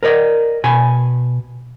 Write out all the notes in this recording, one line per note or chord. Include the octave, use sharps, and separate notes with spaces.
A#4 B4 D5 D#5
B2 G#5 B5